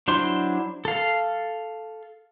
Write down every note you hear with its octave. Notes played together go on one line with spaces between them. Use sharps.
F#3 D4 E4 C5 C6
A4 F5